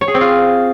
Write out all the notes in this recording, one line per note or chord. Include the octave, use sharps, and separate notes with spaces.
C#5
G#4
C4
F4